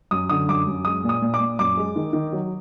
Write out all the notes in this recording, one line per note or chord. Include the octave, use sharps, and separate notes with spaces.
F#2 D#6
D3 D#6
F#2 D6
F#2
G#3 D#6
A#2
D#6
A#2
D6
A#2
F#2 D6
G#3
D#3
D#3
F#3